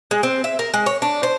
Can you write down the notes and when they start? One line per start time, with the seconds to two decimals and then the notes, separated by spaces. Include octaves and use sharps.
0.11 G#3
0.23 C4
0.44 E5
0.59 A#4
0.74 G#3
0.86 C#5
1.02 D4
1.23 C5